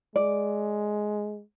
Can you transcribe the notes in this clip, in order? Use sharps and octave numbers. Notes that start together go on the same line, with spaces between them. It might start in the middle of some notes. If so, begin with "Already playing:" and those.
G#3 D5